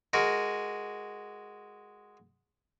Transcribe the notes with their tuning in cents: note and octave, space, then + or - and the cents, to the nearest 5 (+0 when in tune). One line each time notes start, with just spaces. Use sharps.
G#3 +0 F#4 +0 A#4 +0